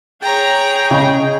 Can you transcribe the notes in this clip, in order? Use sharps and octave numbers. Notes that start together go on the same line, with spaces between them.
G#4 C#5 G5 A#5
C#3 C#4 D#5